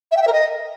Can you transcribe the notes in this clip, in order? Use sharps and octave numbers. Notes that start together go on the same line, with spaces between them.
E5
G5
E5
A#4
D#5